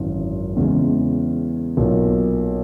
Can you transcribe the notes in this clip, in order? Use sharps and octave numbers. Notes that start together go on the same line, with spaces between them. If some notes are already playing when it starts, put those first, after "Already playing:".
Already playing: G#1 F#2 C#3 E3
E2 C#3 G#3
B1 A#2 A#3